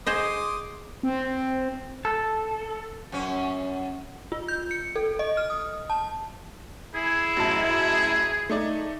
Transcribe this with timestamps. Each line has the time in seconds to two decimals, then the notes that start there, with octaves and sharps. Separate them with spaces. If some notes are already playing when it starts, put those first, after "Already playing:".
0.07 G#4 C5 D#5 C6 D6 D#6
1.03 C4
2.05 A4
3.12 F#2 C#4
4.32 F4
4.48 G6
4.71 C#7
4.96 A4
5.19 D#5
5.37 F6
5.50 D#6
5.90 A5
6.95 E4 G#4
7.36 A1 F#2 A5
8.50 A3 D#4 D5